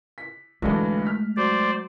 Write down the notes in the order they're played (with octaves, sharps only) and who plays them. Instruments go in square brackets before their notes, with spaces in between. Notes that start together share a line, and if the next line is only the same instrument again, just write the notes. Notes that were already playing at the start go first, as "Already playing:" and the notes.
[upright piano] B6
[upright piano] B1 D3 E3 [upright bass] G#3 A3
[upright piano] F6 B6
[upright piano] F#3 [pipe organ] C5 D5